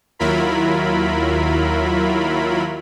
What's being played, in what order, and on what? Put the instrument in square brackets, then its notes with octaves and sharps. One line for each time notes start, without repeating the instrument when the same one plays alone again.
[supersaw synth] D#2 F#3 E4 F4 A#4 B5